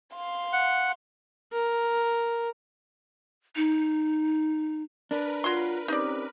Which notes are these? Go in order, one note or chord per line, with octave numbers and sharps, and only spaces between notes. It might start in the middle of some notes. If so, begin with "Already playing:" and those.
F5 C6
F#5
A#4
D#4
D4 A#4 B4
F#3 F4 C6
C4 C#4 D#4 G4 D5